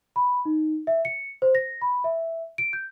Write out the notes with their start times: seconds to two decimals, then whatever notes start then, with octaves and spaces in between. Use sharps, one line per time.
0.16 B5
0.45 D#4
0.87 E5
1.05 C#7
1.42 C5
1.55 A#6
1.81 B5
2.04 E5
2.58 D7
2.73 G6